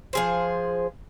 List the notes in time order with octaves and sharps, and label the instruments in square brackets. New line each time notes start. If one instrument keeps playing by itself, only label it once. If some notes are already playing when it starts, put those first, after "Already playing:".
[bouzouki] F3 G#4 C5